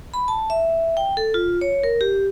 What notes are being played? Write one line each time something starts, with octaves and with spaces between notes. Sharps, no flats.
B5
A5
E5
G5
A4
F4
C#5
A#4
G4